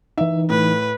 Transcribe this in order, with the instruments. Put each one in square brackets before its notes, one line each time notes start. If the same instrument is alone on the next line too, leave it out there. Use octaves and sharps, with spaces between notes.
[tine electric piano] E3 D#4 [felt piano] E5
[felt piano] A2 [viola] B4